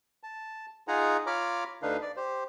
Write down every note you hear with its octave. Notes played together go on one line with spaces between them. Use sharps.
A5
D#4 F4 G#4 F#5 G#5 A#5
F4 C#5 A#5 B5 D6 F6
D2 D3 D4 D#4 B4 F5
D5
G4 C5